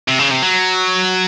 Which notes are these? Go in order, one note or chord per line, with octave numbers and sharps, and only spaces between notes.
C3
C#3
C3
F#3